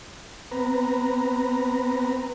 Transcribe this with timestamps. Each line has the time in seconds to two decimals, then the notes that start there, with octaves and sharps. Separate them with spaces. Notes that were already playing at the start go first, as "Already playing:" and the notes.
0.51 B3 C4 B4 A#5